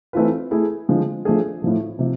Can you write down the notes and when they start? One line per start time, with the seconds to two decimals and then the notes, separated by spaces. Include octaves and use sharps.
0.13 E3 A3 C4 F4 B4
0.51 A3 E4 G#4
0.89 D3 F3 G#3
1.25 F3 A3 D4 G#4
1.62 A2 F3 A3
1.99 C3 F3